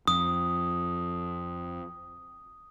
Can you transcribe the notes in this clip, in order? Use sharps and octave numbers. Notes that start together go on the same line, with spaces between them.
F2 D#6